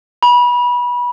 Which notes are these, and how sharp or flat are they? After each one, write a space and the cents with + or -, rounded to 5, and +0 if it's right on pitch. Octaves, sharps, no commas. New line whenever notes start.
B5 -25